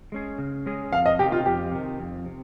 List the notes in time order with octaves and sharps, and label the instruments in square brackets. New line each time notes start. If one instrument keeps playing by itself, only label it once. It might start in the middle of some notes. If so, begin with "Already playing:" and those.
[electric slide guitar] G#3 C#4 G#4
C#3
G#3 C#4 G#4
[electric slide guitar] F2 [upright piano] F5
[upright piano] D#5
[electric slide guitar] C3 D#3 [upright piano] G4
[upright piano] F4
[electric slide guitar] F2 [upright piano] G4
[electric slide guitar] C3 D#3
F2
C3